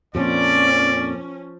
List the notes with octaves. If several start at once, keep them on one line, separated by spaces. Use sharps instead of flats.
F2 A#2 F3 C#4 D5